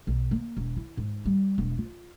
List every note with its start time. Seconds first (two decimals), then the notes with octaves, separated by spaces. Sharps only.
0.07 B1
0.31 A#3
0.57 E1
0.77 E4
0.97 G#2
1.26 G3
1.58 E1
1.78 F4